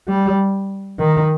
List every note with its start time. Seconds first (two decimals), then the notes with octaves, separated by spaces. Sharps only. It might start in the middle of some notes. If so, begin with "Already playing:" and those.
0.09 G3
0.99 D#3